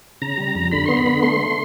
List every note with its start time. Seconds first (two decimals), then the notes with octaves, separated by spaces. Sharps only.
0.22 C#3 A#5
0.38 G3
0.55 F2
0.72 D3 B5
0.85 B3 C6
0.97 B5
1.06 D3
1.22 A3 C6
1.40 A3